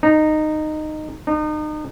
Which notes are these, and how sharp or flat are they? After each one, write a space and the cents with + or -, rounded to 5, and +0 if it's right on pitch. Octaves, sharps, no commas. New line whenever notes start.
D#4 -15
D#4 -35